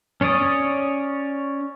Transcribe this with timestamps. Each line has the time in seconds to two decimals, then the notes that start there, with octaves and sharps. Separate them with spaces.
0.21 C#4 C#5 D5 D#6